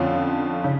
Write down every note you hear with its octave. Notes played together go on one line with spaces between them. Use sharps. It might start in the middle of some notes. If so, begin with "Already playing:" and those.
Already playing: F2 D3 F3 C#4 F4
C#3